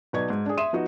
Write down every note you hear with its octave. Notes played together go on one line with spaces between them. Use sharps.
B1 D#4 B4 D5 C#6 G#6
G#2
D4 G#4
E5 C6 D#6 D#7 E7
F3 B3 D#4 F#4